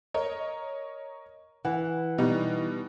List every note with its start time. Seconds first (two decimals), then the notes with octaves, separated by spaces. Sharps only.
0.14 A#4 C#5 D#5
1.65 E3 F#5
2.18 B2 G3 D#4